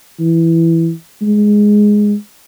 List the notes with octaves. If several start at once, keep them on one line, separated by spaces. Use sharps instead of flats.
E3
G#3